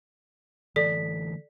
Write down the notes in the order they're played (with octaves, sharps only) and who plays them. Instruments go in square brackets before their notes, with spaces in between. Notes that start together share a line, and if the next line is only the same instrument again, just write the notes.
[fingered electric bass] D3 E3 A3 [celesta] A4 B6 [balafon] D5